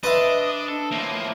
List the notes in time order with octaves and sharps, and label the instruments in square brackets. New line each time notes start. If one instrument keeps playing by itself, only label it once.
[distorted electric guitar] D4 [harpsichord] B4 C5 E5 [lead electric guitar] D#5
[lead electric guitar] A4
[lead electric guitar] A2 F3 [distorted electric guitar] A#3